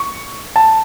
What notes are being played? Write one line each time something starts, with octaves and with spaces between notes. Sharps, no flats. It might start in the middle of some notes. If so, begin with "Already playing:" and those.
Already playing: C#6
A5